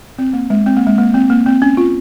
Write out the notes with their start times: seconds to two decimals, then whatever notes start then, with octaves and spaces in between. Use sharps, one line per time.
0.18 C4
0.33 A#3
0.50 G#3
0.66 C4
0.77 A#3
0.87 G#3
0.98 A#3
1.14 C4
1.30 A#3
1.46 C4
1.62 C#4
1.77 F4